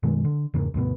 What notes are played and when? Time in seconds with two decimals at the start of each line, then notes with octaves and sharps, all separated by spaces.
0.03 F#2 B2 D#3 G#3
0.25 D3
0.54 E2 G#2 C#3 A#3
0.74 D2 G2 B2 B3